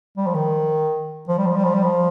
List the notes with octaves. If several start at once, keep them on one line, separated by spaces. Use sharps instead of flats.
G3
F3
D#3
F3
G3
F3
G3
F3
G3
F3